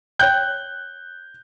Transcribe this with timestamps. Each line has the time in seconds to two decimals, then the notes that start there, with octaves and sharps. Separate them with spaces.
0.19 C#5 G5 F#6 G6